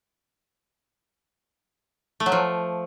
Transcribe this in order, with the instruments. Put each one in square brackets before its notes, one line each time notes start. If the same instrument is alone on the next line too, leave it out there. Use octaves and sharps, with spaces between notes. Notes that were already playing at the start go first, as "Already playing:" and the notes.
[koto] A3
F#3
F3